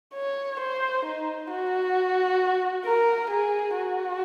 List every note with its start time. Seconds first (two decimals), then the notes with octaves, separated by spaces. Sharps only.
0.14 C#5
0.60 C5
1.05 D#4
1.50 F#4
2.86 A#4
3.30 G#4
3.75 F#4